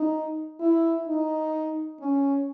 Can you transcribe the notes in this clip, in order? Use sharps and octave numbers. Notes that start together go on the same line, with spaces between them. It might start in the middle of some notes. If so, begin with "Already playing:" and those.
Already playing: D#4
E4
D#4
C#4